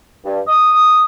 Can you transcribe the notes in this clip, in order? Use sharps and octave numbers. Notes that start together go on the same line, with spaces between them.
G2
D#6